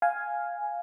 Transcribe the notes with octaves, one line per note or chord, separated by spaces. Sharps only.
F5 G#5